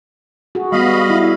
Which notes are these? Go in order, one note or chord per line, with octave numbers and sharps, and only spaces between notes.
F#4 G#4
G3 B3 F#4 D#5 F5 B5
E4